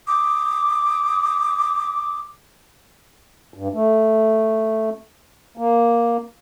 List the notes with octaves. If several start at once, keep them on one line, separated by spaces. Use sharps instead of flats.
D6 D#6
G2
A3
A#3